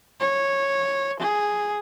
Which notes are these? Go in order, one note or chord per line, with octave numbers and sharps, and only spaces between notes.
C#5
G#4